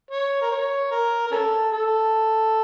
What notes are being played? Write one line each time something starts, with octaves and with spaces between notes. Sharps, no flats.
C#5
A#4
C#5
A#4
A#4
C#4 A4
A4